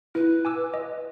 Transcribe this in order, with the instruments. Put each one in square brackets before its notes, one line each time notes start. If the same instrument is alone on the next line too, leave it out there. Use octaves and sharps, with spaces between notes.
[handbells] E4 [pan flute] B4
[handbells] G#5 D6 E6
D#5